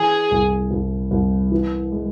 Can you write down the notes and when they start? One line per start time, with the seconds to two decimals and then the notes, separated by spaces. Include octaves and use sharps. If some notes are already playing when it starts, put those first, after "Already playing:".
Already playing: E3 G#4
0.31 C2
0.71 C2
1.11 C2
1.52 E3
1.92 G#3